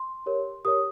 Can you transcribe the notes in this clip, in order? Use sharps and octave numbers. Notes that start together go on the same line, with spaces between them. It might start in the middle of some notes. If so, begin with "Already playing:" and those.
Already playing: C6
G4 A#4 C#5
G4 A#4 C#5 D#6